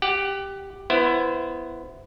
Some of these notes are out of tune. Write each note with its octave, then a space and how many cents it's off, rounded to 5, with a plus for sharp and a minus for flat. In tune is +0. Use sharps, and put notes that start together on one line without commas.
G4 +0 F#5 +25
B3 +0 E4 +15 C5 -10